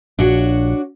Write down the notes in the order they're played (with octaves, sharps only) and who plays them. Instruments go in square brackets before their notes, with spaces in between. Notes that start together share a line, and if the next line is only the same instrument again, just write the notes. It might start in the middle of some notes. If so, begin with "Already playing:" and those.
[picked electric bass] A#1 [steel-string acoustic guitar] D4 F#4 C#5